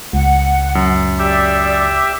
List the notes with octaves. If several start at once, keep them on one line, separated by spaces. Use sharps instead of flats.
C#2 F#5
F#2
G4 D5 E5